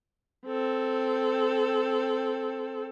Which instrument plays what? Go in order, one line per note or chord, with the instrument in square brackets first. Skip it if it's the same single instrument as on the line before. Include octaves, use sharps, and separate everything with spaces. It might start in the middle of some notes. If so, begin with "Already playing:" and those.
[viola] C4 A4